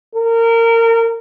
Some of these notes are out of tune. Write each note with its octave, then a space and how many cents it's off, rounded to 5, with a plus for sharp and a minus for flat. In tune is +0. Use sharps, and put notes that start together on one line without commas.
A#4 -25